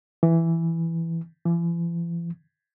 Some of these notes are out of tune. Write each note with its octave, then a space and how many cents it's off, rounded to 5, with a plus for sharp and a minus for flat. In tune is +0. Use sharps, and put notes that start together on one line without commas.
E3 +5
E3 +45